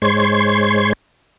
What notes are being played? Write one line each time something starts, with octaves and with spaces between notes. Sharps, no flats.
G#2 G#3 C5 C#5 C6 G#6